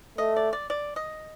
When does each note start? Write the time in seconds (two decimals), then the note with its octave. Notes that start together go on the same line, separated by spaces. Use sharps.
0.18 A3 D#5
0.36 D5
0.53 D5
0.70 D5
0.96 D#5